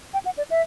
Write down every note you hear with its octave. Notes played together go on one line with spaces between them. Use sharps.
G5
F#5
D5
E5